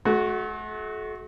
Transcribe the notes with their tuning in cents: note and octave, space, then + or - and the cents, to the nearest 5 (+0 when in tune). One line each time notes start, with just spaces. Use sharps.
A3 -40 F#4 +0